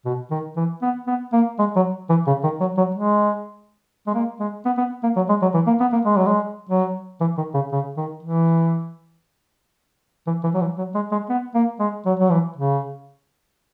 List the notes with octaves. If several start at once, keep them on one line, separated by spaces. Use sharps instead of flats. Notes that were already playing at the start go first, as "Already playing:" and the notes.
B2
D#3
E3
B3
B3
A#3
G#3
F#3
E3
C#3
D#3
F#3
F#3
G#3
G#3
A#3
G#3
B3
B3
A#3
F#3
G#3
F#3
E3
A#3
B3
A#3
G#3
F#3
G#3
F#3
E3
D#3
C#3
C#3
D#3
E3
E3
E3
F#3
E3
F#3
G#3
G#3
B3
A#3
G#3
F#3
F#3
E3
C#3